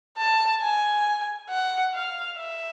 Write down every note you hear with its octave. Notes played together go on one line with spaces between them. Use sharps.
A5
G#5
F#5
F5
E5